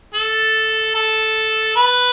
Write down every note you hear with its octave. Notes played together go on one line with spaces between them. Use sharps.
A4
A4
B4